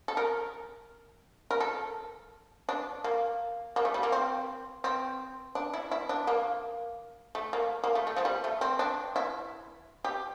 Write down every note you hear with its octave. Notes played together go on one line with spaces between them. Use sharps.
A4
A#4
A#4
A4
D4
A#3
A#3
A3
G3
A#3
C4
C4
D4
E4
E4
D4
A#3
A3
A#3
A#3
A3
A3
F3
G3
A3
C4
D4
E4
G4